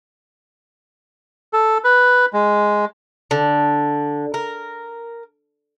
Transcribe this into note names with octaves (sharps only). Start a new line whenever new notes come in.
A4
B4
G#3
D3
A#4